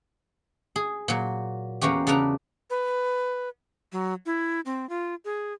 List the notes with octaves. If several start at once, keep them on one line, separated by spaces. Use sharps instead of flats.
G#4
A#2 F#3
E2 A#3 C#4 F#4 G4
C#3 D4 A#4 B4 A#5
B4
F#3
E4
C4
F4
G#4